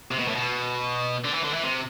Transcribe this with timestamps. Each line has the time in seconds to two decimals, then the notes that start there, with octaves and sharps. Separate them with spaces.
0.11 C3
0.19 B2
0.28 A2
0.35 B2
1.25 D3
1.34 E3
1.44 D3
1.53 E3
1.63 C3